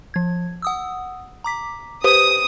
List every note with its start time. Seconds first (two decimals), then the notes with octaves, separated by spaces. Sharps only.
0.14 F3 G#6
0.62 F#5 D#6 E6
1.44 A#5 D6 B6
2.04 G4 B4 C5 D#6